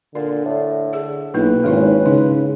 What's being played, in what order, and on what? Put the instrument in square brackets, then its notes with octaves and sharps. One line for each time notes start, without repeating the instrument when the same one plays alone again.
[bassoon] A#2 [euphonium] D3 [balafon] D4
[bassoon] A2
[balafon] G#4 E5
[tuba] B1 [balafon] A#3 D4 E4 [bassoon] B4
[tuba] G#1 [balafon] G#3 D#4 E4 [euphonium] C#4
[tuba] C#3 [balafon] D#4